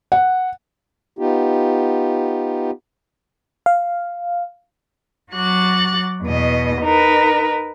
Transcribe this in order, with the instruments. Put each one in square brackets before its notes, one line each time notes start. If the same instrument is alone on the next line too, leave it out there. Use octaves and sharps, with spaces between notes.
[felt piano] F#5
[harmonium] B3 D#4 F4 G4
[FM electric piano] F5
[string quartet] F#3 F#4 D6 F#6 A6
E2 B2 D#5
D#4 A#4 B4